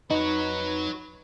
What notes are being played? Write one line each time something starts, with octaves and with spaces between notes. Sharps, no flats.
F2 D#4 F#4 B4 C#5